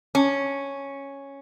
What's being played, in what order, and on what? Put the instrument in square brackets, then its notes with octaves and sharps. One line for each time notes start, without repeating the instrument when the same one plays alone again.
[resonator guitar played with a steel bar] C#4